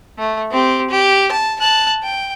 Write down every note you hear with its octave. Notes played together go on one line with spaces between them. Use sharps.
A3
C4 G4
G4
A5
A5 F#6
G5